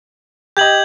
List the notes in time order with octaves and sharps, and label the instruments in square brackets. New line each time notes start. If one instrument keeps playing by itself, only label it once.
[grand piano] G4 D#5 [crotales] G6 G#6 F#7